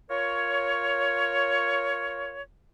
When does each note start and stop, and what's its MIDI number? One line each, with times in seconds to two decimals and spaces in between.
0.10 2.42 65
0.10 2.42 70
0.10 2.42 73